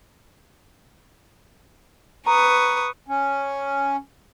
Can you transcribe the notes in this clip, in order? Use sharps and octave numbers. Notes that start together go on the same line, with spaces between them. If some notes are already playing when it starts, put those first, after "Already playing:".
B4 A#5 C#6 D#6
C#4